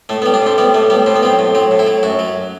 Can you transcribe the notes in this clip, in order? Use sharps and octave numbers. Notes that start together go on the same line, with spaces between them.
A2 A3
B3
G3
D4
A2 C4
G3 B3
A2 A3
G3 B3
A2 C4
B3
F#3 C4
A2
F#3 C4
A2
E4
F#3
F#2 F#4
F#3